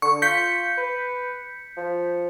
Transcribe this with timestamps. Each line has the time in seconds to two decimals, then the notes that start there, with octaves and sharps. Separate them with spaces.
0.02 D3 C#6
0.22 F4 G6 B6 C#7
0.77 B4
1.77 F3